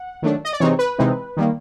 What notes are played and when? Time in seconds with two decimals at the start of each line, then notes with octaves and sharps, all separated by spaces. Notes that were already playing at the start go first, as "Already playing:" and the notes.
Already playing: F#5
0.22 D#3 F#3 A3 D4
0.45 D#5
0.53 D5
0.60 C3 E3 G#3 C4 D#4 C#5
0.79 B4
0.99 C3 E3 G#3 C4 D#4
1.37 D#3 G3 A#3